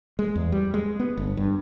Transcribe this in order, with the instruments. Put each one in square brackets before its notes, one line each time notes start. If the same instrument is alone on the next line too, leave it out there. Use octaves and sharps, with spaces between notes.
[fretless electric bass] G#3
E2
G3
G#3
B3
G1
G2